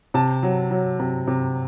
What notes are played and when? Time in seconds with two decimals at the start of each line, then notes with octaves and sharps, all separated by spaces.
0.14 C3 A5
0.43 F#3
0.71 F#3
1.00 C3
1.27 C3